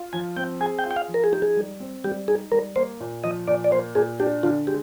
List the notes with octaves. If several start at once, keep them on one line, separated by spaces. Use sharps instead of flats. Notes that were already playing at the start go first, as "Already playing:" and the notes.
Already playing: F4
F3 G#5
C4 G5
G#4 G#5
G5
F4
G5
F5
F3
A#4
G#4
D#4 G4
G#4
G3
C4
G3 G4
D#4 G#4
G3 A#4
A#3 C5
A#2
F3 D#5
A#2 D5
D5
A#3 C5
A#2 G#4
D4 G4
D3 F4
G#3 G4